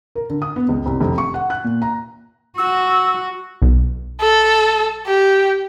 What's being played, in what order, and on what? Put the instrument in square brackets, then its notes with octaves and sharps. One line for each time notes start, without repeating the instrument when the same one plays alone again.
[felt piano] A#4
D3
D#6
B3
C#2
C2
F1
C#6
F#5
F#6
A#2
A#5
[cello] F#4 [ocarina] E6
[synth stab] B1
[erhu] A4
G4